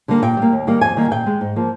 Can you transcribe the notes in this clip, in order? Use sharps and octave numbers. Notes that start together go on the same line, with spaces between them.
D3 G3 A#3
A#2 G5
G3 A#3
D#2
D#3 G3 A#3
F2 G#5
D#3 G3 A#3
A#2 G5
G#3
G#2
F3 A#3